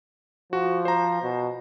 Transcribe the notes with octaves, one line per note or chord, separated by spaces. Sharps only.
F3 F#4
C5 A#5
B2